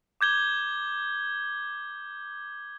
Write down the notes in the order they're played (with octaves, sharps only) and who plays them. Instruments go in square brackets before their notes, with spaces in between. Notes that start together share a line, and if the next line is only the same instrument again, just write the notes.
[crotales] D6 G6 G#6 G7